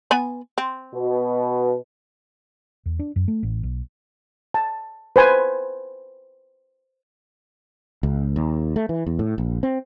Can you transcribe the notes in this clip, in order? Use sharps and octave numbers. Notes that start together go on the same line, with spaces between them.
B3 G#5 B5
C4
B2
E2
D4
F#2
A3
A1
B1
A5
B4 C5 G#5
C#2
D#2
A3
E3
E2
A2
A#1
C4